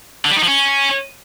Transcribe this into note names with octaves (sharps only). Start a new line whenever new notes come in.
D3
G3
D#4
F3
C#4